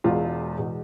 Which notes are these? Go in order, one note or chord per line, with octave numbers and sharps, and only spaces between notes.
E1 E2 B2 G#3 F4
E2 B2 G#3